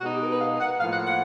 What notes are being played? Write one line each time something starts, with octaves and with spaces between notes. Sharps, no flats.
B2 G#3 B3 D#4 F#4
G4
A#4
B4
F5
F#5
A2 F3 A#3 F5
F#5
F#5